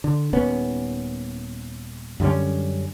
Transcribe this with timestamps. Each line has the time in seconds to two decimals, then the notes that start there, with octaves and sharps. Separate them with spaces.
0.04 D3
0.33 D#1 D#2 B3 C#4
2.20 F#2 D3 G3 C#4